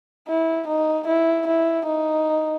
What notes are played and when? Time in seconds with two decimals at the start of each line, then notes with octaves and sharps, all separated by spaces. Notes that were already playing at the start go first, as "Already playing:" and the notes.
0.28 E4
0.68 D#4
1.07 E4
1.47 E4
1.86 D#4